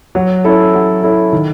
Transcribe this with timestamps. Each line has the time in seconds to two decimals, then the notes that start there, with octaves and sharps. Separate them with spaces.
0.15 F#3
0.44 C#4 E4 A4
0.74 F#3
1.03 C#4 E4 A4
1.33 D#3